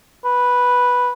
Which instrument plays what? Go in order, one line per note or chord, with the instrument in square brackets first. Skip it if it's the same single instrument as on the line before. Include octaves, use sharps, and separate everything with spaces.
[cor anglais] B4